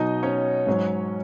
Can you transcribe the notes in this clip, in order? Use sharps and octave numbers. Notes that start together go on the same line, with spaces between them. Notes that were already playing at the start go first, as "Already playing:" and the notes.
Already playing: B2 F#3 D#4 D#5
C#4 C#5
G#2 F#3